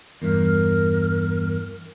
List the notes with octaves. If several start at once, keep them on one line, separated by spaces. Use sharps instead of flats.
E2 G2 A#4